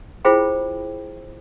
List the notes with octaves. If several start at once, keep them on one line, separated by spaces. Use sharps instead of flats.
E4 F4 G#4 C5 G5 B5